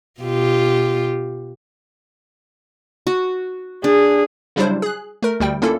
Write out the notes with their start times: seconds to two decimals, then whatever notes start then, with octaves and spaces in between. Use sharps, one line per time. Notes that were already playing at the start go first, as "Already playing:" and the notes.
0.20 B2 F4 G4
3.07 F#4
3.84 D4 G#4
4.56 C#3 F#3 G3 D4 E4 C5
4.82 G#4 F#6
5.22 A3 A#4
5.40 D2 G3 G5
5.62 A#3 C#4 D4 E4 F4 A4